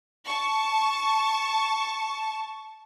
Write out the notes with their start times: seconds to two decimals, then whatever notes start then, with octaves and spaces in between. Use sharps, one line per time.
0.28 A5 C#6